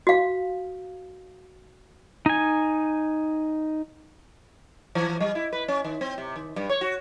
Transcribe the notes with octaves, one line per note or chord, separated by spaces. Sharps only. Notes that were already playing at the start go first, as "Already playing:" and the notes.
F#4 F5
D#4 G#5
E3
G3
E4
B4
C#4
D#3
C4
C3
D#3
G2
C#5
F#4